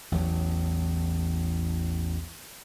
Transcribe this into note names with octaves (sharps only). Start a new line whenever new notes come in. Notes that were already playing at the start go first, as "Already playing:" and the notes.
A1 E2 A2 F#3